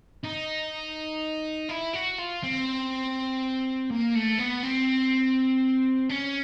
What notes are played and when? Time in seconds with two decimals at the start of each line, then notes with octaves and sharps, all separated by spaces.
0.24 D#4
1.70 E4
1.94 F#4
2.19 F4
2.43 C4
3.90 A#3
4.15 A3
4.38 B3
4.63 C4
6.09 C#4